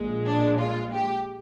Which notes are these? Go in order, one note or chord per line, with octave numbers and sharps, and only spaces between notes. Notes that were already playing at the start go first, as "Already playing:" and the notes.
Already playing: A#1 A#2 G#3
D4
F4
G4